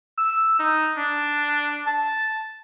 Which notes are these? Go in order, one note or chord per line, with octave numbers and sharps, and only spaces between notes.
E6
D#4
D4
A5